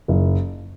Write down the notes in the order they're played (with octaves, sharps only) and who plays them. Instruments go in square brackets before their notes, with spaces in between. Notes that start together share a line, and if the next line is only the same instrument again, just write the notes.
[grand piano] F#1